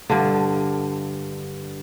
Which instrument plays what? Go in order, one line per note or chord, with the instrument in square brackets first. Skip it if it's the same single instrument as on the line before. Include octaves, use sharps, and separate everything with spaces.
[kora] G2 D3